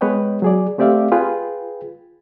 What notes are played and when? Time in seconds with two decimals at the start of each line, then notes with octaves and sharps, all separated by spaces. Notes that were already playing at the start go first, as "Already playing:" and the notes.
0.01 G#3 B3 B4 C#5 D#5 G5
0.42 F#3 G#4 D5
0.78 A3 C4 G4 D5 E5 F5
1.12 F4 G#4 B4 G5